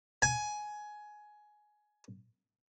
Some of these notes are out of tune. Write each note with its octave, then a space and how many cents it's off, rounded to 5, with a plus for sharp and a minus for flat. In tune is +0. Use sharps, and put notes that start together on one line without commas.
G#5 +15